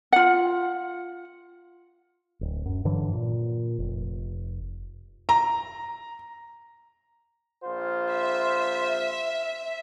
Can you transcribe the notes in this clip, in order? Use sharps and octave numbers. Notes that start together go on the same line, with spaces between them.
F4 F#5
D1
F#2
G2 D3 E3 F#3
A#2
F1
A#5
A#1 F4 C5
E5